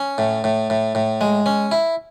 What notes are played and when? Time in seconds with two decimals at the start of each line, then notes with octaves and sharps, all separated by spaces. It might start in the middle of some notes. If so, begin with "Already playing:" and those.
Already playing: C#4
0.18 A2
0.44 A2
0.70 A2
0.95 A2
1.21 G#3
1.46 C#4
1.72 E4